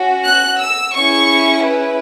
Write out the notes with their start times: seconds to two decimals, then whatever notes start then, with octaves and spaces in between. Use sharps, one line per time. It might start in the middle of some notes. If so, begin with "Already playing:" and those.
Already playing: C#4 F#4
0.27 F#6
0.62 E6
0.95 C#4 E4 G#4 C#6
1.65 B4